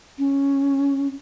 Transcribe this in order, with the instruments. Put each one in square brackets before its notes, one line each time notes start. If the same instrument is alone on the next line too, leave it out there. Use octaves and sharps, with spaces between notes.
[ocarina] C#4